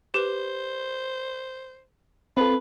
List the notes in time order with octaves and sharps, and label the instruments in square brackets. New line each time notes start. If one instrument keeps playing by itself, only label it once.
[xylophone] G4 B4 [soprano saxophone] C5
[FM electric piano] C4 A4 [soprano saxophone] F4 [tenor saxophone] B4